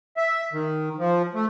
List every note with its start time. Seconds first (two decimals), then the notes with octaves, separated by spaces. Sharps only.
0.17 E5
0.53 D#3
0.99 F3
1.35 A3